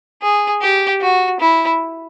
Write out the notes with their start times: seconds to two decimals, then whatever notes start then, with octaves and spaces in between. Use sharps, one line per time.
0.22 G#4
0.61 G4
1.01 F#4
1.40 E4